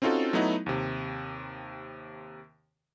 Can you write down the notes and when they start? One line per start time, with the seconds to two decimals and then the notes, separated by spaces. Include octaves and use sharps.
0.02 C4 C#4 D#4 F4 F#4 A4
0.33 F#3 A3 B3 D#4 E4 F#4
0.66 D#2 C3